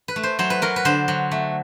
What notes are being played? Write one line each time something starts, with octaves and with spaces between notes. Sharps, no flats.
B4
A3
C5
F#3 C5
B4
F#3 A#4
B4
D3 C5
F#3
A3